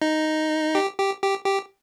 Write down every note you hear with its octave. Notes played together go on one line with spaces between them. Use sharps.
D#4
G4
G4
G4
G4